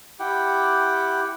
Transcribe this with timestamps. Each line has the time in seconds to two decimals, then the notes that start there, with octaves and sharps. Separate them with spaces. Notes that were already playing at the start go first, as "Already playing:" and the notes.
0.19 E4 G4 F#5 G5